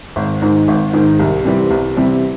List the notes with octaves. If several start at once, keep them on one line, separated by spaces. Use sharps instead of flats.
G#1
G#2 D#3
G#1
G#2 D#3
C2
C3 E3 G3 C4
C2
C3 E3 G3 C4